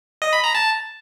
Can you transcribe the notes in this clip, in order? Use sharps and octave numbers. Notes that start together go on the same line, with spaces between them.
D#5
B5
A#5
A5